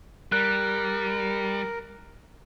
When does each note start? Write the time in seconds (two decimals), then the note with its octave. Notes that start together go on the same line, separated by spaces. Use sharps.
0.32 G3 A#4 F#6